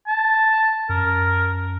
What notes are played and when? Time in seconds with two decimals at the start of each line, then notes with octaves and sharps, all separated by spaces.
0.07 A5
0.89 F#2 A#4